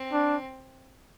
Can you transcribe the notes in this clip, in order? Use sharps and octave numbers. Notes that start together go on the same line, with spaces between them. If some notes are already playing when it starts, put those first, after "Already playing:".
Already playing: C4
D4